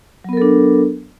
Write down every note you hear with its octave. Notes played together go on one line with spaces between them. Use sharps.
F#3 B3 D4 A4 A#4